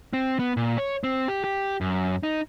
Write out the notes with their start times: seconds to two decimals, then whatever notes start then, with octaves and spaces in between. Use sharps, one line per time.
0.13 C4
0.39 B3
0.57 A#2
0.78 C#5
1.04 C4
1.28 G4
1.44 G4
1.81 F#2
2.23 D#4